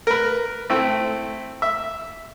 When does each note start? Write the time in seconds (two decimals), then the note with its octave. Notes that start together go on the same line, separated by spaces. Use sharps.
0.07 A#4 B4
0.70 A3 C4 E4
1.62 E5